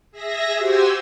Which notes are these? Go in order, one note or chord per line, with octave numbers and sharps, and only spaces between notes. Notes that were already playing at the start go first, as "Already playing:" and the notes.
G#4 E5 A#6
F#4 G4 C5 G#5 E6